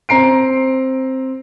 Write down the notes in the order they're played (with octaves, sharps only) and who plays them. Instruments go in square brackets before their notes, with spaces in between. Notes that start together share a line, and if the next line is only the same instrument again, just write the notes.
[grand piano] C4 A#5 C7 D7